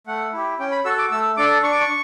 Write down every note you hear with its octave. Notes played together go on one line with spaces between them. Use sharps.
A3 F#5
E4 G4
C#4 G5
B5
F#4 A4 E6
D6
A3 E6
D4 A4 D6
D4 C#6
D6
C#6